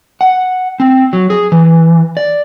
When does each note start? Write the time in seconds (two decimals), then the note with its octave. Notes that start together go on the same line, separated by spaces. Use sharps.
0.21 F#5
0.80 C4
1.13 F#3
1.30 G#4
1.52 E3
2.17 D5